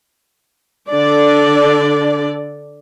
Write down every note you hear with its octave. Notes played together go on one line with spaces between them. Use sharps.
D3 D4 D5